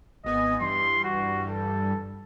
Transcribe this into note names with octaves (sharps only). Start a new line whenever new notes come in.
G#1 B3 D#5 G#5
G2 E3 G3 C6
F#4
A4